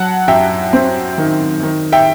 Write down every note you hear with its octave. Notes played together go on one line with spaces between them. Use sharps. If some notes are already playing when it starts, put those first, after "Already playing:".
Already playing: F#3 F#5 A5
F#2 E5 G5
C4
D#3
D#3
E5 G5